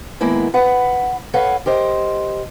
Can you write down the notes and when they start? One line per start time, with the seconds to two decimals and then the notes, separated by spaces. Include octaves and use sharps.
0.21 D#3 G#3 A#3 B3 E4
0.54 B4 F#5
1.34 A4 B4 C#5 F5 F#5
1.66 G4 A#4 C5 D#5